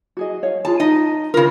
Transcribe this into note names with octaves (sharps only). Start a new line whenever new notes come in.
F#4 G#4 D#5
C#5 F5
F4 G#4 A5 B5
D#4 D#5
C#3 F4 A#4